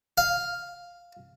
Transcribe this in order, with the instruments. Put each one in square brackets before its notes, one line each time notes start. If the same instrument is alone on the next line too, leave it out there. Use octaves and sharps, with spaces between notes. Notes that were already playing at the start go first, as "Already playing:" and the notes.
[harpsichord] F5